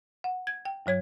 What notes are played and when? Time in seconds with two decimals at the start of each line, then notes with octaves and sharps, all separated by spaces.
0.24 F#5
0.47 G#6
0.65 G5
0.86 G2 F#3 C#5 G#6